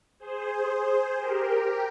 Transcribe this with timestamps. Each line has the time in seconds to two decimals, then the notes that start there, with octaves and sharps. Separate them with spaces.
0.19 G#4 C5
1.16 G4 A#4